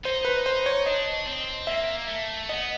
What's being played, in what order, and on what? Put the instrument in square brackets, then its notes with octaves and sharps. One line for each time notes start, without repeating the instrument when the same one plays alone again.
[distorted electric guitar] D#4 [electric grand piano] C5
[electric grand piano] B4
C5
C#5
[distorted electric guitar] D4 [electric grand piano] D#5
[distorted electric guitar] C4
[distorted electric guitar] A#3 [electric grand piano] E5
[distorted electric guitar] A3
[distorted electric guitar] B3 [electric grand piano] D#5